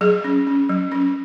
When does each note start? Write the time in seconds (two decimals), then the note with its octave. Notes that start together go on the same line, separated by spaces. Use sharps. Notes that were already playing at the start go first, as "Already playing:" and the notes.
0.01 F#3 G#4
0.24 C#4
0.47 C#4
0.69 F#3
0.92 C#4